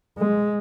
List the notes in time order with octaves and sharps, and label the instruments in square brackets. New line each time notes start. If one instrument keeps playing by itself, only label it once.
[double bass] G#3